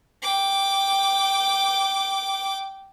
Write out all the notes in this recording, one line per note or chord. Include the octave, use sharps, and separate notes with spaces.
G5 D6